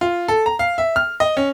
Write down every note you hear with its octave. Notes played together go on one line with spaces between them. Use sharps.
F4
A4
A#5
F5
E5
F6
D#5
C#4